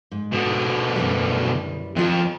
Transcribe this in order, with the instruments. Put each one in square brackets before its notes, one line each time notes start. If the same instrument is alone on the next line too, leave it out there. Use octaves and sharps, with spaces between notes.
[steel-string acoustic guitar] G#2
[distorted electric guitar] B2 D3
[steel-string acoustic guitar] F#2 E3 G3
[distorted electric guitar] F2 [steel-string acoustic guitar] D#3 F4 A5